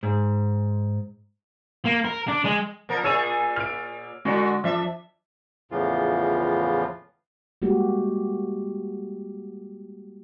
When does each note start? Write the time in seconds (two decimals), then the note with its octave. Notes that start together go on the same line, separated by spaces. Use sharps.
0.03 G#2
1.85 A#3
2.05 A#4
2.28 D4
2.45 G#3
2.89 A#2 F3 A#4
3.04 A#2 G#4 C#5 E6 A6 D#7
3.56 F6 D7
4.25 D3 G#3 F#4 D5
4.64 F2 D4 E5
5.71 E2 A2 C#3 E3 F3 F4
7.62 G3 G#3 A#3 F#4 G4